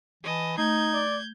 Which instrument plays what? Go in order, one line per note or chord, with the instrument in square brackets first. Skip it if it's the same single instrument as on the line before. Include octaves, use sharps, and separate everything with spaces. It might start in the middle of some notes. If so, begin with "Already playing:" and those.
[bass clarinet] E3 [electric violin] D#5 A5
[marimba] A3 [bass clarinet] D#4 [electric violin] G6 G#6
[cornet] D5